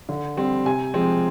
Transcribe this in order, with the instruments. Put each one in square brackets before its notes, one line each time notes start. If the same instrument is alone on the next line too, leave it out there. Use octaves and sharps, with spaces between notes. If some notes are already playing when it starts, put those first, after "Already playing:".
[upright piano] D3
G3 C4
C3 G#5
F3 G#3 C4